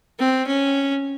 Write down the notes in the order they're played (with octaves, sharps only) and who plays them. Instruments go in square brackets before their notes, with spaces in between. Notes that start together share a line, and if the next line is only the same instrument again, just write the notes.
[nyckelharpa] C4
C#4